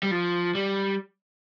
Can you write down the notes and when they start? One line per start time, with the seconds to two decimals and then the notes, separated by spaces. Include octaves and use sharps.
0.03 G3
0.11 F3
0.55 G3